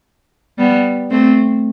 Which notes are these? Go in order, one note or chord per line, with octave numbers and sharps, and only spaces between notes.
G3 B3
A3 C4